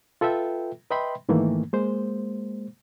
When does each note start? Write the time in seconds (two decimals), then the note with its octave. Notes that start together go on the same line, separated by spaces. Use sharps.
0.21 F4 A4 B4 E5 G5
0.90 B4 D#5 E5 G5 B5 C6
1.29 G#2 D#3 E3 A3 A#3
1.73 G#3 A#3 C5